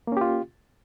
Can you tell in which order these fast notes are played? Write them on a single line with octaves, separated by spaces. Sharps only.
A#3 C#4 G4 F4